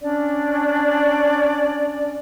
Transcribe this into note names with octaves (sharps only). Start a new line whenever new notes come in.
C#4 D4 D5